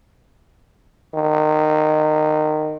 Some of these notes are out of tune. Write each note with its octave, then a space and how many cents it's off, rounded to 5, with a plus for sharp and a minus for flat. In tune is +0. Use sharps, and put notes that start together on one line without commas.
D#3 -20